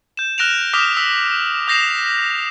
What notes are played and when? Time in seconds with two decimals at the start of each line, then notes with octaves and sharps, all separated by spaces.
0.17 G6 E7
0.38 F6 F#6 A#6 D7 E7 F7
0.74 D6 D#6 F6 A#6 B6 E7
0.97 E6 B6
1.68 D#6 G6 A#6 C7 E7 F7